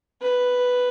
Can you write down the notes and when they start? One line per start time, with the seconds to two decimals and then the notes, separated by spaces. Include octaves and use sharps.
0.22 B4